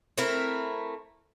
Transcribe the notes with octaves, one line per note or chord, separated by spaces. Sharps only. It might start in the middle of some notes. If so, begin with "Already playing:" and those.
A3 C4 E4 A#4